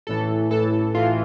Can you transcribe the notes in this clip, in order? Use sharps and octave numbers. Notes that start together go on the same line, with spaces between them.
A1 A2 E3 A4
A1 A2 E3 A4
A1 A2 E3 F4